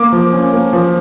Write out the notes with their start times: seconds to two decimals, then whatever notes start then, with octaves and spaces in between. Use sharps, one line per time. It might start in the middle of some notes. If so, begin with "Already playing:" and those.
Already playing: A#3 D6
0.12 F3
0.33 C#4
0.53 A#3
0.73 F3